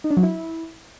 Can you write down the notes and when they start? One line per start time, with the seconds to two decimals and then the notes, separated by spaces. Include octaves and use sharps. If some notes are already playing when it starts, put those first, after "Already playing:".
0.04 D#4
0.10 D4
0.17 F#3
0.23 E4